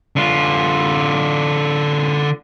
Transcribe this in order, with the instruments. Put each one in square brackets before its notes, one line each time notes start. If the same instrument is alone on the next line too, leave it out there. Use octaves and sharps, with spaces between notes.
[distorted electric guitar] D3 F4